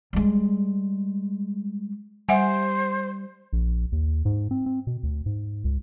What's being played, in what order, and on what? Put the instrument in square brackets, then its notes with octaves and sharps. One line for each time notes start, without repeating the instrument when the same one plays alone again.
[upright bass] G3 G#3
[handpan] G3 [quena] C5 [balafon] E5 F#5 G#5
[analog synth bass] A#1
D#2
G#2
C4
C4
B2
D2
G#2
C#2